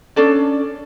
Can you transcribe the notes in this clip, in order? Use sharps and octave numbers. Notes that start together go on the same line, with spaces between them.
C#4 D4 A4 D5